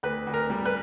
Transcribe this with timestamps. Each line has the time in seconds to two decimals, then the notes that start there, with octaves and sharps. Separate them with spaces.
0.03 D2 B4
0.27 D2
0.34 A#4
0.50 G3
0.65 B4